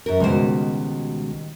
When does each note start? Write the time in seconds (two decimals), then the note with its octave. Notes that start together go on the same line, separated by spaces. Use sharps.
0.06 F#2 A#4
0.20 C#2 B2 D#3 G3 C5